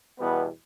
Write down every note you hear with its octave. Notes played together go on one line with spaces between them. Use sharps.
E2 B2 G3 B3 B4